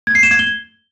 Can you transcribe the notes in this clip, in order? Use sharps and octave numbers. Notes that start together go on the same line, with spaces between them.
G#6
C7
E7
G#6
G7